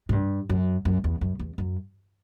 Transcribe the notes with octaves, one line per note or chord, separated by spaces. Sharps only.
A2
G2
F#2
F#2
E2
F#2
E2
F#2